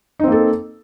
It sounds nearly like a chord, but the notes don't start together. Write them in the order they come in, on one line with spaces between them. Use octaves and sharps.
D#4 C4 A#3 A4